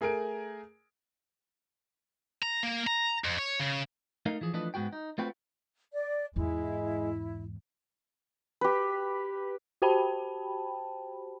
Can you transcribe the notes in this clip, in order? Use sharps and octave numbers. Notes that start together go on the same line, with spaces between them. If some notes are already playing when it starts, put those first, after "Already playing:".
A3 G#4 A#4 G#5 D7
A#5
A#3
A#5
F2
C#5
C#3
A3 D#4 A#4 D#5 F5
E3 F3 G#4
E3 F3 A3 D4 B4 D#5
G#2 G#3 B3 F#4 G5
D#4
A3 C4 F4 F#4 B4 G5
D5
E2 G#2 G#3 E4
G4 B4
F#4 G4 C5 G5 A5 B5